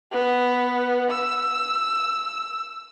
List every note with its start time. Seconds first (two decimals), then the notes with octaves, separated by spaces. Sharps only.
0.12 B3
1.11 E6